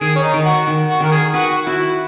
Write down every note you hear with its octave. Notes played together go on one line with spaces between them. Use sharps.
D#3 G#4
C#4
D#4
D#3
F#4
D#3
F#4
D#3 A#4
G#4
F#4 B4
E4 F#4